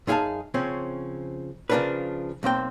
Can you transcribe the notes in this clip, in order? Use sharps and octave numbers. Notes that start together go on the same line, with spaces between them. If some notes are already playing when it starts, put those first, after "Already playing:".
F#2 D#4 G#4 F5 G#5 A5
C#3 F3 C4 C#4
C#3 F3 C#4 D4 A#4 B4
B1 A#3 C4 G5